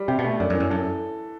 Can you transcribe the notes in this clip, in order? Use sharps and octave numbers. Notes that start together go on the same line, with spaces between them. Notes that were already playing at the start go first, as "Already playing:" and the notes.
Already playing: G3
C3 G4
B2
A3
F#2 D4
F#2
E3
F#2
F#2 A4